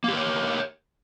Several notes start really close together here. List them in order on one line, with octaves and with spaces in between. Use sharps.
A#3 G4 A#4 C#5